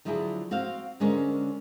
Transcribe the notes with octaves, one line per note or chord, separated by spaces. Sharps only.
D3 F3 F#3 E4 G#4
C4 F#4 C5 F5
D3 G#3 C#4 A#4 C5